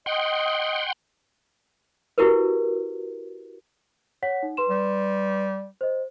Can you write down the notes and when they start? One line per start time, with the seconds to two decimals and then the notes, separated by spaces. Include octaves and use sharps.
0.06 D#5 F#5 G5 C6
2.18 E4 F#4 G4 A#4 B4
4.23 C#5 F#5 B6
4.43 D#4
4.57 B4 C6 E7
4.69 G3
5.81 C5 D#5